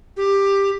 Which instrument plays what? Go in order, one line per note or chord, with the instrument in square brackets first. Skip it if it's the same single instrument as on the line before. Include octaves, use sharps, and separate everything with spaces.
[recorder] G4